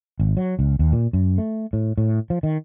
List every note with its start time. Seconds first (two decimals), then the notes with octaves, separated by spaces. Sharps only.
0.20 G#1
0.37 F#3
0.59 C#2
0.79 D#2
0.92 A#2
1.13 F#2
1.38 A3
1.73 A2
1.98 A2
2.30 F3
2.43 D#3